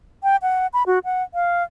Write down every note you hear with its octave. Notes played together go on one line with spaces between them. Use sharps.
G5
F#5
B5
F#4
F#5
F5